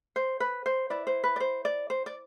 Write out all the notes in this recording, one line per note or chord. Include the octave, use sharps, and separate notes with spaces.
C5
B4
C5
E4 B4 D5
C5
B4
D5
C5
D5
C5
D5